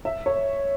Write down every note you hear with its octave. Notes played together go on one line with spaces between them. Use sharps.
E5
C#5